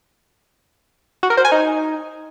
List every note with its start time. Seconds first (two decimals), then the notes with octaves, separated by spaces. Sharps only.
1.23 F#4
1.30 A#4
1.37 C5
1.45 G#5
1.52 D#4